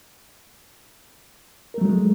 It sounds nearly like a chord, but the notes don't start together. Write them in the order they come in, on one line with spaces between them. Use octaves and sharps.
A#4 A3 F#3 G#3